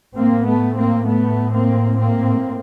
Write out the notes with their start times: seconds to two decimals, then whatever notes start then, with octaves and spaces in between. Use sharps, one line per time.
0.15 A2 A#3 C4
0.46 A3 B3
0.76 A#3 C4
1.07 A3 B3
1.53 A#3 C4
1.99 A#3 C4